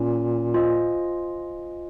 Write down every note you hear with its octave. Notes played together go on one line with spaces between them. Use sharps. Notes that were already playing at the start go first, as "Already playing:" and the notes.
Already playing: A#2 C#4
F4 C5 D#5 G#5